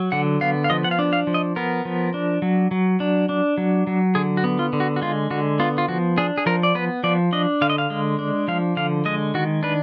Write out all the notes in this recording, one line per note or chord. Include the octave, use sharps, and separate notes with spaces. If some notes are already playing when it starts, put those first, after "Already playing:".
Already playing: F#3
D3 F#5
B3 F5
F5
F3 D#5
F#5
F5
D4
F5
F3
D#5
B3 A#4
F3
D4
F#3
F#3
D4
D4
F#3
F#3
D3 G#4
F#4
B3
F4
D3
F#4
F#4
G#3 F4
D3 F#4
B3 F4
F4
F3 F#4
D4 G#4
G#4
F3 A#4
D5
B3 B4
F3 D5
D4 D#5
D3 F5
D#5
F5
G#3
D4
F3 F5
D3 F5
G#3 D#5
D#3 F#4
D4 B4